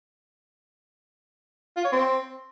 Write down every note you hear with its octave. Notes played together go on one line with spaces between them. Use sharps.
F4
C#5
C4